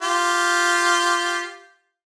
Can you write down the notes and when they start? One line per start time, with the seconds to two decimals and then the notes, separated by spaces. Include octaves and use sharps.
0.02 F4 G4